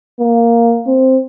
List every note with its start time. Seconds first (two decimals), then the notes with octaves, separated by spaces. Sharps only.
0.20 A#3
0.87 C4